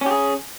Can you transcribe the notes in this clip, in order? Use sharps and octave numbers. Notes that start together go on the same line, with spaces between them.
C#4 G4 G#4